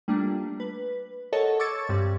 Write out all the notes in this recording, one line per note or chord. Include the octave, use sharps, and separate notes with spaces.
G3 A3 A#3 D4 F4
B4
A4 A#4 C#5 D#5 F#5 A5
C#6 D6 E6 G#6 A6 C#7
G2 G3 C4